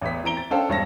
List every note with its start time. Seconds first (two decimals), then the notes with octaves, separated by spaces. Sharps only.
0.01 A1 E2 B3 B6
0.24 E3 C4 A#5 D7 G7
0.37 A6
0.51 C#4 D4 A4 C5 F5 G5
0.69 E1 G2 C#5 A5 A#6